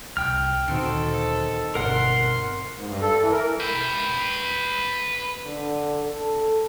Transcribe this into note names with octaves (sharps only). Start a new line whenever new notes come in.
C2 C3 G5 F6
D2 A#2 D#3 C4 F#4 A4
G1 B2 A#4 F#5 C6
G#2
G2
A4
E3
A#4
B4 G5
D3
A4